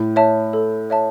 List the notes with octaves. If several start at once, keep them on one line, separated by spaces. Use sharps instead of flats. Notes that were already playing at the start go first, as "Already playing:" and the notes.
Already playing: A2
C#5 E5 A5
A4
C#5 E5 A5